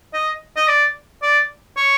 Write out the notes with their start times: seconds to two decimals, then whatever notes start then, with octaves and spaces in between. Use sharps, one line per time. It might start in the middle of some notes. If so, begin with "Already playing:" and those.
0.14 D#5
0.56 D#5
0.68 D5
1.22 D5
1.77 C#5